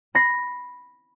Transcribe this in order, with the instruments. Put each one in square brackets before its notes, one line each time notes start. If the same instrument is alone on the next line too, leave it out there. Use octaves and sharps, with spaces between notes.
[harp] B5 A#6 C7